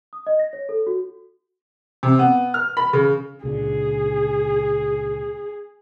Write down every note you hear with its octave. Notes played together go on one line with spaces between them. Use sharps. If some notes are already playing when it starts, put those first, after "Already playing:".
D#6
D#5
A#6
C#5
A4
F#4
C3
B3
F6
B5
C#3
C#2 A#2 D3 G#4